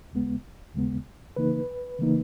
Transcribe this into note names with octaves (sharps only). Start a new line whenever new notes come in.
D#2 C#3 G#3 B3
D#2 C#3 G#3 B3
C#3 E3 A#3 D#4 B4
C#3 E3 A#3 D#4